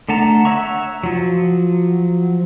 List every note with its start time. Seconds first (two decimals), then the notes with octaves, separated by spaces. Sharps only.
0.09 D3 A3 F#5 A5 A#5
0.45 C#5 E5 F#5 A#5 C#6
1.03 F3 F#3